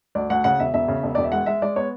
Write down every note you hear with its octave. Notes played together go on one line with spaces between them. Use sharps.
D2 D5
D2 F#5
C#3 F#5
E1 E5
E1 E5
C#3
E1
E1 D5
E5
G#3 F#5
G#3 E5
G#3 D5
B3 C#5